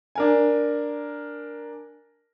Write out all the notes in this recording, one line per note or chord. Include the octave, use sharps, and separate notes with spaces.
D4 A#4 G#5